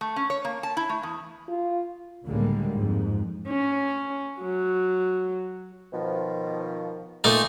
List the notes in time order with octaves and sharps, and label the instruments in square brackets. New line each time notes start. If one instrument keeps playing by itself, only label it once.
[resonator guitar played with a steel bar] A3
C#4
C#5
A#3
A5
E4
A3
E2
[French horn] F4
[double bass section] C#2 A2 D3 G3 G#3 A#3
F2 G#2
[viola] C#4
F#3
[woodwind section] B2 D#3 F3
[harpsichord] A#2 A3 D#4